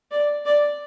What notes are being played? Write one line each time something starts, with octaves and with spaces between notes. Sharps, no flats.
D5
D5